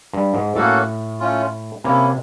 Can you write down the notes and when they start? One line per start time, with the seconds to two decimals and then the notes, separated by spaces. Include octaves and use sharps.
0.13 G2
0.34 G#2
0.56 A2 A#3 C#4 F#4 A4
1.20 A3 C#4 F4
1.84 C3 A#3 C#4 E4